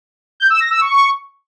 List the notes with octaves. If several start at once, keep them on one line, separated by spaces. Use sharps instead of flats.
G6
E6
A#6
E6
C#6